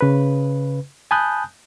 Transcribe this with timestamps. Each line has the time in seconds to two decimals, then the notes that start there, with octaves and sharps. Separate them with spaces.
0.01 C#3 B4
1.11 G#5 A5 B5 D#6 F#6 G6